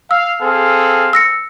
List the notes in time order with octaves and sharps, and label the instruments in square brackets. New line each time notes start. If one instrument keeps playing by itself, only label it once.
[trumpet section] F5 [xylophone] E6
[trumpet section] C4 G#4 A4 [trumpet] F5
[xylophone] E6 A#6 C#7